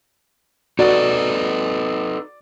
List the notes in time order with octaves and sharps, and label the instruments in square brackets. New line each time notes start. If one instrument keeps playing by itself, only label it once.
[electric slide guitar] D#4 A4 B4 [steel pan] F#4 [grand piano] D5